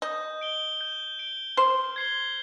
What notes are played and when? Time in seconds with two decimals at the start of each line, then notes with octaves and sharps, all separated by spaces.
0.02 D#5 G6
0.41 D7 G7
0.81 G6
1.19 D7 G7
1.57 C5 F6
1.96 G#6 C7 G7